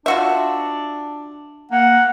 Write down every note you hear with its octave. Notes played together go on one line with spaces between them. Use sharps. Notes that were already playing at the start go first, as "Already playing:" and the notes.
D4 F4 F#4 E5
A#3 F#5